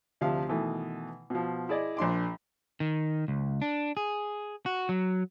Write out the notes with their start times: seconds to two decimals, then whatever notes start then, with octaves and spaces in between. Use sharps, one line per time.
0.21 D2 C3 F3 F5
0.48 B2 D#3 E3 A3
1.30 B2 F3
1.69 E4 G#4 D5 D#5
1.97 A#1 D4 C6 D6
2.80 D#3
3.28 C#2
3.61 D4
3.97 G#4
4.66 F#4
4.89 F#3